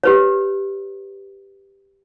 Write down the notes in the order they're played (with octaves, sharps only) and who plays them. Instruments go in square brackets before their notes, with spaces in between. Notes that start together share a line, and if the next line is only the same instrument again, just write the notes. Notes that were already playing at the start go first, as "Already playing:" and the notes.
[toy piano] G4 B4 C#5